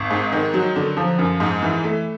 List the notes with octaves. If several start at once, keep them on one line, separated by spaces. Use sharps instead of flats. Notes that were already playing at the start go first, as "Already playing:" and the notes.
Already playing: G#1
G#2
D#3
F#3
D3
F3
F#2
G#2
E3
A3